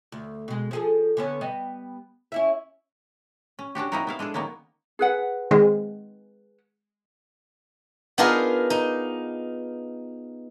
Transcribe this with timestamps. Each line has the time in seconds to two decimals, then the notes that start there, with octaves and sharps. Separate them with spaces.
0.12 D2
0.48 B2 G#3
0.71 F3 G#4 A4
1.17 D3 B3 C#4
1.41 G3 B3 D#5
2.32 C#4 E4 E5
3.59 C#4
3.75 C#4 D4 F#4 G4
3.92 A#3 C4 D#4 E4 F#4 A#4
4.07 B3 E4 F5
4.19 G#3 D4 G#4 A4
4.34 D#3 F#3 A#3 B3 C#4
4.99 G#4 B4 F#5
5.51 D#3 G#3 C4
8.18 B3 D4 D#4 F4 G#4 A#4
8.70 D#4